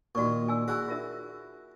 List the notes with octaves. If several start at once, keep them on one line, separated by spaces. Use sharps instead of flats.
A#2 D#3 F#4 D5 C#6
G#5 E6
E4 F#4 G#4 G#5 E6
F4 A#4 E5